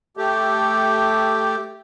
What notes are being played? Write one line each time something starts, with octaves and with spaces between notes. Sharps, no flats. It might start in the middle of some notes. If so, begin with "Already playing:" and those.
A3 G4